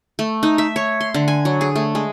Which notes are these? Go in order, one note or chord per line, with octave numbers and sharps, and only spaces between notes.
A3
D#4
E5
C#5
C6
D3
G#5
F#3
G#4
A3
G#3